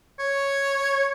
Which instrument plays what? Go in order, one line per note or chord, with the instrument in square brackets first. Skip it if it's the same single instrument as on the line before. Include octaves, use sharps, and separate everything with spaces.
[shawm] C#5